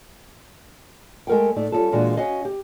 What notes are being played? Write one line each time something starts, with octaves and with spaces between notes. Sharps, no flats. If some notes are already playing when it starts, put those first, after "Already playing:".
G#3 A3 A#4 F#5 G5
A2 A3 D#4 D5
G3 C#4 D#4 F4 A4
A#2 E3 G#3 D4 F#4
C#4 F#4 D#5 F5
G4